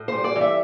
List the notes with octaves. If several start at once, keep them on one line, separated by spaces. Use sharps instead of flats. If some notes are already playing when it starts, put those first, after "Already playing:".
Already playing: A2
G3 C5
D5
E3
E5